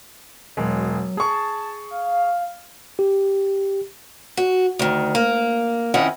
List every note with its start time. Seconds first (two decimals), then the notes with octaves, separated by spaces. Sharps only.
0.57 E1 F#3 G#3
1.17 G#4 A5 C#6
1.91 F5
2.99 G4
4.37 F#4
4.79 D2 D#3
5.15 A#3
5.94 F2 D#3 C#4 E4 D#5 F#5